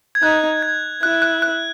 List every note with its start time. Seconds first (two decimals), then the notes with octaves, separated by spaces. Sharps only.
0.15 G#6
0.22 D#4 F#6
0.63 G#6
1.02 E4 F#6
1.22 F#6
1.42 F#6